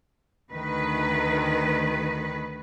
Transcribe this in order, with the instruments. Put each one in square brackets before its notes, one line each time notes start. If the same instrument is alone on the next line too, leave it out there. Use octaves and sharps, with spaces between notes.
[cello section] D2 D#3 B4